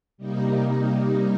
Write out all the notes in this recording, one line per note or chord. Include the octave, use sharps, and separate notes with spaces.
C3 G3 A#3 D#4